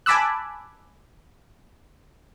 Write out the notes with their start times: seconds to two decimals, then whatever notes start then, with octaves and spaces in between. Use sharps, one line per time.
0.06 G#5 A5 B5 D6 E6 F#6